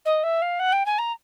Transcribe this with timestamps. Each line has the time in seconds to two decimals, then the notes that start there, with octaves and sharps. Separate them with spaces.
0.05 D#5
0.23 E5
0.42 F5
0.59 F#5
0.72 G5
0.86 G#5
0.98 A#5